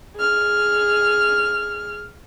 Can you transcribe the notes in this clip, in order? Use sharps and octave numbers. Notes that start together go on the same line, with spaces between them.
G#4 F6